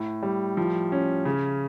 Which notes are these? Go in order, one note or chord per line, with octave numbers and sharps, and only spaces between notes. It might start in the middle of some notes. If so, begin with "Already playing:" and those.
Already playing: A2
G3
F3
C#4
C#3